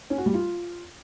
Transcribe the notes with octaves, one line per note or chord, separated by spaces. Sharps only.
C#4
F#4
G3
F4